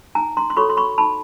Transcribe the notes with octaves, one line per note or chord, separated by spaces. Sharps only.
D#4 G#5 A#5
A#5 C6
C6
F#4 A4 C#5 B5 C#6
C6
B5 C#6
D#4 A5 B5